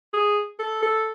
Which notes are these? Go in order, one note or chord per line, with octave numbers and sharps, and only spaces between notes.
G#4
A4
A4